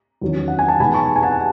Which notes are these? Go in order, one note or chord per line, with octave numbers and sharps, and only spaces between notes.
E2 D#3 F#3 C#4
F#5
G#5
A5
B2 G#3 B3 D#4 G#5 B5
A5 C#6
G#5
F#5 A5